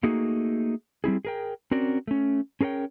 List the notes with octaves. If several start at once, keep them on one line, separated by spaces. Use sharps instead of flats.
A3 A#3 D#4 F#4 G#4
G3 C4 E4 G#4
G#4 A#4 G5
C4 C#4 F#4 A#4 D5
A3 C#4
C#4 G#4 A#4 C#5 G5